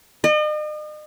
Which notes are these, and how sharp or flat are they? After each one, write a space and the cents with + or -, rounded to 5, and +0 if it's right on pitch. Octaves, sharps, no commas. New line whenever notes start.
D#5 -40